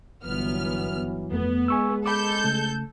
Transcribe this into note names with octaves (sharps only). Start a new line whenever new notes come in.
G1 E3 F#3 B3 F6
F2 A3 B3
G#3 G#5 C#6 E6
A4 B5 D6 G6
C#3 A3